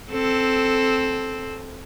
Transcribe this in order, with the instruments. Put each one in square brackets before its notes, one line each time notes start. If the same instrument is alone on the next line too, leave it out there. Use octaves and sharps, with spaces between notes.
[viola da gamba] C4 A4